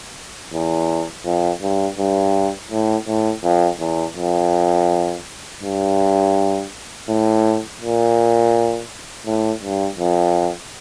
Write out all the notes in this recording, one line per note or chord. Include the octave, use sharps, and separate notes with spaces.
E2
F2
G2
G2
A2
A2
F2
E2
F2
G2
A2
A#2
A2
G2
F2